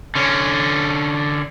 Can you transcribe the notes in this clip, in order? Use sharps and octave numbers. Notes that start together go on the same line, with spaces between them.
D3 C#4